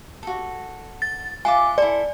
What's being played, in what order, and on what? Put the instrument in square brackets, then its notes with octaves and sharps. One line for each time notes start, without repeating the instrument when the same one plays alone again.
[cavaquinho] F#4 A4
[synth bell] A6
[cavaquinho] F4 E5 D6 [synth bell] G#5
[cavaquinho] E4 A4 [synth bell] D5